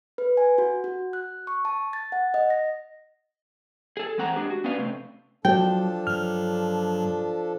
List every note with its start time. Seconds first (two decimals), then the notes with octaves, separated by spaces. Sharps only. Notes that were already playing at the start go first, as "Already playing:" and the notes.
0.18 B4
0.37 G#5
0.58 F#4
0.84 F#4
1.13 F#6
1.47 C#6
1.65 A5
1.93 A6
2.12 F#5
2.34 D#5
2.50 A#6
3.97 G#4 A4
4.18 E2 G#3 C4 F#5 A5 A#5
4.36 G#3 D4 G4 G#4
4.50 F#4
4.64 B3 C#4 D4 B4 F5
4.78 C3 A3 C4
5.45 F3 F#3 D4 A4 G5
6.07 G2 F#3 F6